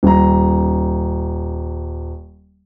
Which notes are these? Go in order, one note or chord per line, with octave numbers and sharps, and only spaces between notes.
D#1 A#5